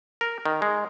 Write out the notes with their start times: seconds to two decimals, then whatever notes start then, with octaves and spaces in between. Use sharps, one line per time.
0.21 A#4
0.46 D#3
0.62 G#3